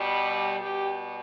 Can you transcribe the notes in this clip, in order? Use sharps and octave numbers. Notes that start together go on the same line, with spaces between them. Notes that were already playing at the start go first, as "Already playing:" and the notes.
Already playing: B2 G3
B2 G3 G4